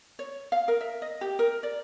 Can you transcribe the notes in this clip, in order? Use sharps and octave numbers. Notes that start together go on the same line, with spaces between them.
C#5
F5
A#4
E5
D#5
G4
A#4
D5